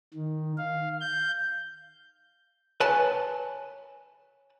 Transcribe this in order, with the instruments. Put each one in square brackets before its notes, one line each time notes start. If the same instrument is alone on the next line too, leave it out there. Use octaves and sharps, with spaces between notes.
[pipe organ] D#3
F5
G6
[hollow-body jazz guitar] B4 C#5 G#5 A5